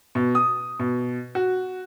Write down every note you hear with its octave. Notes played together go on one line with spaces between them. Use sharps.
B2
D#6
B2
F#4